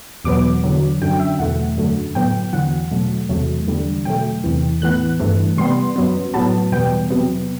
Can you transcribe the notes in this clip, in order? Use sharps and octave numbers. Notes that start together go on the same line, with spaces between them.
E2 B2 F#3 B3 D6
E2 D3 F#3
F#2 D3 F#3 G5
E5
E2 B2 A3 F#5
F#2 D3 F#3 A3
A2 F#3 B3 G5
E2 D3 F#3 F#5
B2 F#3 A3
E2 C3 F#3 A3
E2 D3 G3
B2 F#3 A3 G5
E2 C3 E3
A2 E3 B3 F#6
G2 E3 A3
C3 G3 B3 C6
F#2 F#3 B3
A2 F#3 B3 A5
E2 B2 G3 B3 G5
C3 F#3 B3